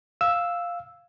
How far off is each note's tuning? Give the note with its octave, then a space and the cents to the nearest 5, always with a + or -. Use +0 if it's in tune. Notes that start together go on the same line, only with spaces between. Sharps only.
F5 +0 E6 +0